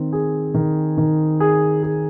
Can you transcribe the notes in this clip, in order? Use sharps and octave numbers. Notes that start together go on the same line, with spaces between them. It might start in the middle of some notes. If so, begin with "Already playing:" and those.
Already playing: D#3 C4
G#4
D#3
D#3
G#4
G#4